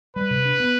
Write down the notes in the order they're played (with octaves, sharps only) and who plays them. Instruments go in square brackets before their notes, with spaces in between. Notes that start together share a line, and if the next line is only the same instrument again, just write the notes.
[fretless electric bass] G3 [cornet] B4
[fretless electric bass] C3
D4
B3